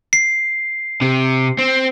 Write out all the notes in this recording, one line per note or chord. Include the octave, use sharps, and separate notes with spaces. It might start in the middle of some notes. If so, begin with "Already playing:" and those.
C7
C3
C4